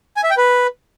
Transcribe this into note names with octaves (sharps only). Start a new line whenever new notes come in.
G#5
E5
G5
B4